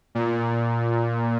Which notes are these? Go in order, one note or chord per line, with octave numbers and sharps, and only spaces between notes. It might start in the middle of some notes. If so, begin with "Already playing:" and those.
A#2